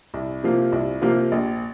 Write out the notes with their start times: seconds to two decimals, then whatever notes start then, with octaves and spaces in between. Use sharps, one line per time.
0.14 C2
0.44 C3 F3 A#3 F4
0.72 C2
1.02 C3 F3 A#3 F4
1.32 A#1